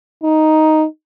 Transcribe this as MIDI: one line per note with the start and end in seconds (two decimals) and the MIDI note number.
0.24 0.86 63